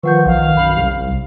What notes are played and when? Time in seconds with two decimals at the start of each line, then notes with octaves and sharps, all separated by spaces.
0.03 D#3 F3 B4 F#5 C#6 G6
0.26 B1 D#3 F5
0.57 F#2 B5 F#7
0.76 C2 G4